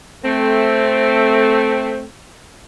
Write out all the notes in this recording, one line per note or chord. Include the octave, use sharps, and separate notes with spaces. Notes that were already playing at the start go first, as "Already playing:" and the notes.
A3 C4